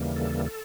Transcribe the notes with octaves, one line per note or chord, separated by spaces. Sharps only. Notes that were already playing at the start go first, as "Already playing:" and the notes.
Already playing: D#2 C#3 E3 G3 A#3
A4
A4